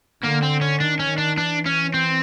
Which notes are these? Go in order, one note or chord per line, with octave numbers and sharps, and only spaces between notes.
D3 A#3
C4
C#4
D#3 D4
C#4
D#3
D4
E3 D4
C#4
C4